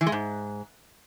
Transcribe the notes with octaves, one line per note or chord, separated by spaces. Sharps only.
E3
G#3
G#2